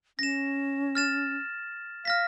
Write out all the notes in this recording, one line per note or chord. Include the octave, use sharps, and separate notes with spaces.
C#4 A#6 E7
F6 A6 E7
F5 F6 A#6 B6